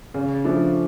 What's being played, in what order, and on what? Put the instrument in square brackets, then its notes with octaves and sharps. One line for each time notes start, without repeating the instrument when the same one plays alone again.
[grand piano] C#3
F3 A3 D4